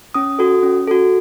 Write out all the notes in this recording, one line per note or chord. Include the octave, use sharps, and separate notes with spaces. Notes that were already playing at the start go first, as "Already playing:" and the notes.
C#4 D#6
F#4 A4
C#4
F#4 A4